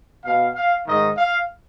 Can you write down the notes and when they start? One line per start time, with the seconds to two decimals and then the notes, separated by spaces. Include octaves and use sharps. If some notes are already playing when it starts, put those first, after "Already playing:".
0.24 B2 F5
0.55 F5
0.86 G#2 D#3 D#5
1.17 F5